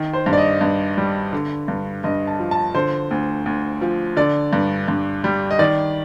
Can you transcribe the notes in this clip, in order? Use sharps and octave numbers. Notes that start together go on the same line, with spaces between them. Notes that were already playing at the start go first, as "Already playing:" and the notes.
Already playing: D#3
C5
G2
D5
D#5
G2
G3
D3
G2
G2 D#5
A5
F3
A5
D3 C5
D2
D2
F3
D3 D5
G2
G2
G3
D#5
D#3 D5